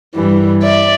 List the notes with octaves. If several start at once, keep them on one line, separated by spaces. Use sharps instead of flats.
G2 E3 G3
D5 E5